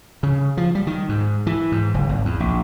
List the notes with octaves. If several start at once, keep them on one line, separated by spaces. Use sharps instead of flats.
C#3
F3
G3
D#3
G#2
E3
G#2
F#1
G#1
E2
A#1